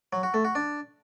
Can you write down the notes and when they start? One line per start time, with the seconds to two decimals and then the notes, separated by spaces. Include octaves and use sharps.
0.13 F#3
0.23 F#4
0.34 A3
0.45 F#4
0.55 D4